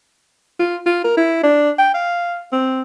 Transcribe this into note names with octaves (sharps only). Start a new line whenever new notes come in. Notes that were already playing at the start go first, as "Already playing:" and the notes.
F4
F4
A#4
E4
D4
G5
F5
C4